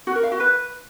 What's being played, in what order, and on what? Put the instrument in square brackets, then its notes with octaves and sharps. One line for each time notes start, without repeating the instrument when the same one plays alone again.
[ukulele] F#4
A#4
F5
F#4
B4